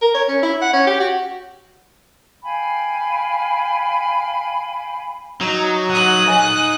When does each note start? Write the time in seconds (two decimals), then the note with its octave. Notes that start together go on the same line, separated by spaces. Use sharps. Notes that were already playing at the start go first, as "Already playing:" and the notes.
0.02 A#4
0.14 C#5
0.28 C#4
0.43 E4
0.62 F#5
0.73 C#4
0.87 G4
1.00 F#4
2.43 F5 G5 G#5 B5
5.41 F#3 D#4
5.90 D#4 F#5 D#6 F#6
6.28 D#5 G#5